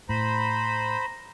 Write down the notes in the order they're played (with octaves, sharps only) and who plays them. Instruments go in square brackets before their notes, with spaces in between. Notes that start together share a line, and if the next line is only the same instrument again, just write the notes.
[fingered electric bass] A2 [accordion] C5 B5 [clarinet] A#5